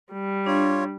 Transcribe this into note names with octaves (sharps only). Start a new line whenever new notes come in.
G3
D4 F4 C#5